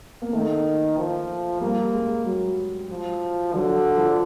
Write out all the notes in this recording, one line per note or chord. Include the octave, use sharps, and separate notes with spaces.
A#3
D#3 A3
F3
G3 A#3
G#3
F#3
F3
D3 F#3
F3